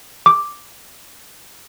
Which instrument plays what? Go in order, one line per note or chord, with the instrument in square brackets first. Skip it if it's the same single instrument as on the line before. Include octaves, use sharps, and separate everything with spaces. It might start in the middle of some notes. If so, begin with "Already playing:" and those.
[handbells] D6